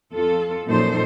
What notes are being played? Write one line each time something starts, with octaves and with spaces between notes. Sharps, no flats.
F2 F4 A4
F#2 A#2 F3 D#4 A4 C5